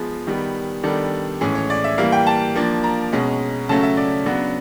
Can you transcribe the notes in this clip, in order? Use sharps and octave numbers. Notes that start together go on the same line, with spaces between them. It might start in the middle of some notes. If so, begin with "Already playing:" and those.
Already playing: F3 G#3 B3 G#4
D#3 G3 B3
D#3 G3 B3 D4 A4
A2 E3 G#3 C#4 G#4
C#5
D5
E5
E3 G3 A#3 F5
G5
A5
F3 A#3 D4
A#5
B2 G#3 C#4
C#3 F#3 A3 C#4 A5
E5
D5
C#3 F#3 B3 D4